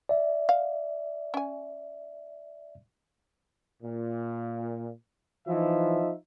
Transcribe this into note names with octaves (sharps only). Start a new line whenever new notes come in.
D5 E5
F5
C#4 G#5
A#2
E3 F3 D#4 E5